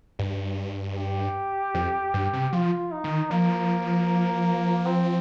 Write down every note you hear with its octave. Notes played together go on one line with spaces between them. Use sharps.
G2
G4
F2
G2
C3
F3 F4
D#4
D#3
F3 A#3
C4